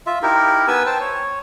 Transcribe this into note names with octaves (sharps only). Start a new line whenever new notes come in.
F4 E5
D#4 E4 G4 A#4
B3 B4 G#5 E6
C5 G5 A5
C#5